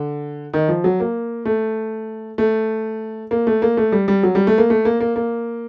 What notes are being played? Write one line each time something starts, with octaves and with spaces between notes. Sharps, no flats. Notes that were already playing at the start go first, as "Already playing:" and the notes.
Already playing: D3
D#3
F3
F#3
A#3
A3
A3
A#3
A3
A#3
A3
G3
G3
F#3
G3
A3
A#3
A3
A#3
A#3
A#3